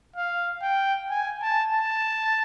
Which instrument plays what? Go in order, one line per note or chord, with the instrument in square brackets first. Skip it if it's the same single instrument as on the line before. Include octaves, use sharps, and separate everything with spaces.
[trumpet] F5
G5
G#5
A5
A5